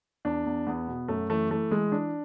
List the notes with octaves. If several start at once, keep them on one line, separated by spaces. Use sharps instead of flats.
E2 D4
E2
E2 B3
B2
F#2 A3
E3 A3
E3 A3
E3 G#3
E3 D4